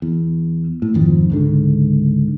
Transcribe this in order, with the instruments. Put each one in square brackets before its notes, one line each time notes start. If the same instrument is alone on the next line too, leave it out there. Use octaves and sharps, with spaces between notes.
[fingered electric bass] E2
A2
G#1 F2 D#3 F3
C#2 G#2 D3